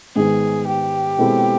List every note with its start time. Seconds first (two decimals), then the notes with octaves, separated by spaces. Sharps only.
0.16 G#2 D#3 G#3 B3 G#4
0.67 G4
1.18 B2 G#3 C4 E4 A4